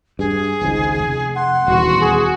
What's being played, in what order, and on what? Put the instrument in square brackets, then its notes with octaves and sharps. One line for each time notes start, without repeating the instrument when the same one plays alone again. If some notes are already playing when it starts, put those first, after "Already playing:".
[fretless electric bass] G2 [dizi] G#4
[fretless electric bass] G#1 C#2 G#2
F1
[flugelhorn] F#5 [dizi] C6
[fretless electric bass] D#1 E2 [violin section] F#4
[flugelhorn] G#4